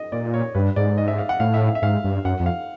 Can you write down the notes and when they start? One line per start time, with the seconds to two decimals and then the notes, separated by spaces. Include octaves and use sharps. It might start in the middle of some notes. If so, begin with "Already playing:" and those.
Already playing: D#5
0.12 A#2 D5
0.34 C#5
0.55 G2 B4
0.76 G#2 D5
0.98 D#5
1.08 E5
1.18 F5
1.29 F#5
1.40 A2 F5
1.54 E5
1.68 F5
1.75 E5
1.82 G#2 F5
2.04 G2
2.25 F#2 F#5
2.40 F2
2.46 F5